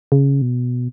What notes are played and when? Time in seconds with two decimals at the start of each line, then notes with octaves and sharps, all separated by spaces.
0.12 C#3
0.42 B2